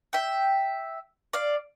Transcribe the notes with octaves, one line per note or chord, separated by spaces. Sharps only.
E5 G5
D5 F5